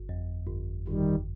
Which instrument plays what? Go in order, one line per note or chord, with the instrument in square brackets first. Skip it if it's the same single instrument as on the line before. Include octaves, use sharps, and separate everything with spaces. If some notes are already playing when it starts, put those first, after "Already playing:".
Already playing: [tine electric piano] G1
F2
G1
[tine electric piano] G1 [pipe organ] D#3 G3